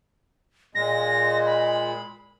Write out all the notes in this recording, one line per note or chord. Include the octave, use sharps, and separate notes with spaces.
A#2 G#3 A#6
B5